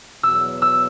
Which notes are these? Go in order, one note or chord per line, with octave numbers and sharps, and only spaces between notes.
E2 B2 F#3 E6
E6